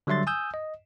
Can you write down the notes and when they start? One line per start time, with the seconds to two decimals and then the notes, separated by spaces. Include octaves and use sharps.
0.07 D3 F#3 G3 E5 C6 A6
0.27 G#5 D#6 E6 G6
0.54 D#5